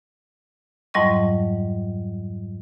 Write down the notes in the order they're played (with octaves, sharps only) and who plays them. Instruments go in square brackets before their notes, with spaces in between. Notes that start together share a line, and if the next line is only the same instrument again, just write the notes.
[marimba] F2 G#2 F#3 G3 D#5 C#6